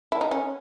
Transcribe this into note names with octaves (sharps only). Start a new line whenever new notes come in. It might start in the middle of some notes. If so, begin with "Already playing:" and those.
E4
D#4
C#4